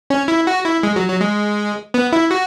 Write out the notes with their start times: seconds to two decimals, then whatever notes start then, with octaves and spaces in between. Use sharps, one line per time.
0.10 C#4
0.28 E4
0.47 F#4
0.65 E4
0.83 G#3
0.96 F#3
1.08 F#3
1.21 G#3
1.94 B3
2.12 E4
2.31 F#4